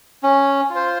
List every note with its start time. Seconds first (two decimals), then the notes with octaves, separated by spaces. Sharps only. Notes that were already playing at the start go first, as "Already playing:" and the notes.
0.23 C#4
0.70 F4
0.75 C5